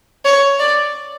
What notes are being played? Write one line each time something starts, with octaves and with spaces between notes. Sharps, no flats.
C#5
D5